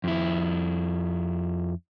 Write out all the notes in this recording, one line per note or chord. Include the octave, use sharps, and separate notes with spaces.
F2 E4